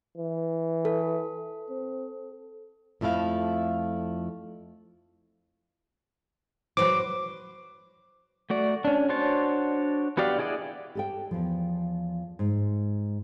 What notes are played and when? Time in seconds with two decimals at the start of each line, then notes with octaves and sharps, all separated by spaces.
0.17 E3
0.85 A4
1.70 C4
3.01 F2 F3 A3 E4 F5
6.77 F#3 B4 C5 D6
8.50 A3 F#4 D5
8.85 C#4 D4
9.09 D4 F#4 C5 C#5 A5
10.17 B3 F#4 G4 D5 F5
10.39 E4 G#4 D5 D#5 F#5
10.95 G4 A4 G5
11.31 E2 F3
12.39 G#2